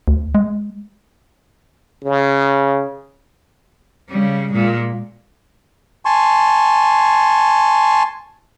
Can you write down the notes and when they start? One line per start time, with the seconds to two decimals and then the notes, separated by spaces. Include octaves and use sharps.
0.08 D2
0.35 G#3
2.04 C#3
4.09 C#3 G3
4.50 A#2 G#3
6.05 G#5 A5 C6 C#6